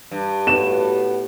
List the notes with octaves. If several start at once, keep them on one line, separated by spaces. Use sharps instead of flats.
G2
A2 B3 F#4 E7